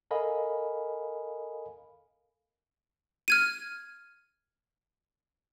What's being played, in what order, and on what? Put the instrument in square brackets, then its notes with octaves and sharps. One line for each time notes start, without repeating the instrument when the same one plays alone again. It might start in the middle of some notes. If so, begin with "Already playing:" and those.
[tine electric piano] A4 A#4 D#5 F5 G#5 B5
[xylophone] F6 G#6 D#7